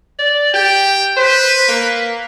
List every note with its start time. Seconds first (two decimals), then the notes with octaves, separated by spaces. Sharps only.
0.19 D5
0.54 G4 G5
1.16 B4 C5
1.68 A#3